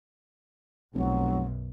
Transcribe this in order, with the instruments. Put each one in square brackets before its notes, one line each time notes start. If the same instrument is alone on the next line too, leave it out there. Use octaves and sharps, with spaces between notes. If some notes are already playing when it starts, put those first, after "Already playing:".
[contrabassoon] F1 [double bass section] B1 F#2 [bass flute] F#3